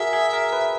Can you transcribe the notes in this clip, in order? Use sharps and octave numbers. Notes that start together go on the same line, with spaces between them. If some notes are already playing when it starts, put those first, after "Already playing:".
Already playing: F#4 G#4 A#4 E5
G#4
A#4
B4